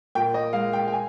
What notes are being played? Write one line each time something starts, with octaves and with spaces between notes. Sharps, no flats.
A#2 G5
D#5
G#3 F5
G5
G5
G#5